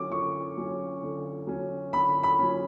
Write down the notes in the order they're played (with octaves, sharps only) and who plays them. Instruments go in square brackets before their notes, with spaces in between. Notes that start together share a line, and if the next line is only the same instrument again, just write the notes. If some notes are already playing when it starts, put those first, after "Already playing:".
Already playing: [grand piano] D3 F#3 C#4 D6
D3 C#6
F#3 C#4
D3
F#3 C#4
D3 B5
B5
F#3 C#4